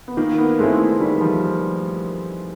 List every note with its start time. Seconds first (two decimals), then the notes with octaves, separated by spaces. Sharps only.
0.08 B3
0.17 D#3 A#3
0.38 B3
0.59 G#3 A3 C4 E4
0.80 A3
0.99 D#3 G3
1.21 F3